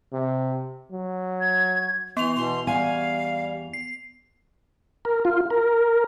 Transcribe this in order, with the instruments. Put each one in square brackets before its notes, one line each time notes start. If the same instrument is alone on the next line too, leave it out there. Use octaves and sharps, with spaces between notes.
[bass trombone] C3
F#3
[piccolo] G#6
[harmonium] E3 [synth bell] B3 F7 [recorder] C6
[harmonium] B2 E3 [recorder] C6
[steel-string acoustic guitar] E2 G#5 [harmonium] G3 [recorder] F5
[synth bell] C7
[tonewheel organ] A#4
F4
A#4